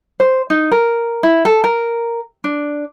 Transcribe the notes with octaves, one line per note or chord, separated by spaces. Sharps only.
C5
D#4
A#4
E4
A4
A#4
D4